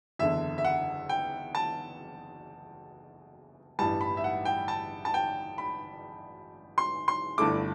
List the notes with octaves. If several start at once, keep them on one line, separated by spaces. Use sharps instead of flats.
F#1 E2 D3 E5
E5
F#5
G5
A5
A1 G2 E3 G3 A5
B5
E5
F#5
G5
A5
A5
G5
B5
C6
C6
G1 G2 D3 A3 E4 D6